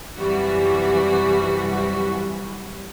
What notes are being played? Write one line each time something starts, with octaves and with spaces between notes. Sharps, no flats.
F#2 C3 E3 G3 F#4